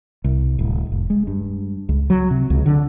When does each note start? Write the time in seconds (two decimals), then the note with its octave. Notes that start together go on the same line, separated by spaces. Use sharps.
0.24 C2
0.59 D1
0.92 F1
1.10 G#3
1.27 G2
1.89 C#2
2.10 F#3
2.31 C3
2.50 C#2
2.66 D3